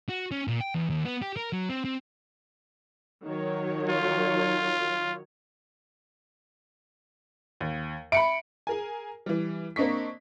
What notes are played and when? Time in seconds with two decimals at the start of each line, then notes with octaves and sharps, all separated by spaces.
0.09 F#4
0.31 C#4
0.48 A#2
0.60 G5
0.75 E2
0.90 D#2
1.06 B3
1.22 G4
1.37 A#4
1.53 F#3
1.69 C4
1.84 C4
3.25 D#3 F#3 C#5
3.89 F4
7.60 D#2
8.12 E5 B5 C#7 D7
8.67 G#4 A#4 G#5
9.26 E3 G3
9.76 A#3 C4 D4 D#5 C#6 B6